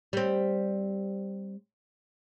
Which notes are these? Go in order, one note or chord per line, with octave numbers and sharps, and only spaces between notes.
G3 C4